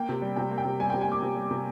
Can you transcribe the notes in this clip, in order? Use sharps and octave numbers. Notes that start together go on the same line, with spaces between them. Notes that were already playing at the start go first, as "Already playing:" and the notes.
Already playing: A#3 G5
C3
G3
C3 G5
A#3
G5
C3
G3 G#5
G5
C3
G#5
A#3 D6
C3
G3
C3